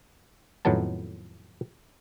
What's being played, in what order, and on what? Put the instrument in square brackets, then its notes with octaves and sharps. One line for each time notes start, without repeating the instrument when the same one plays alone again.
[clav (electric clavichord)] F2 A2 D#3 F#3 B3 A5